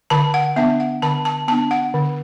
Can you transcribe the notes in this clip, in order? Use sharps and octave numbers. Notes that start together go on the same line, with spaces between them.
D3 A5
F#5
B3 D4 E5
F#5
D3 A5
A5
B3 D4 A5
F#5
D3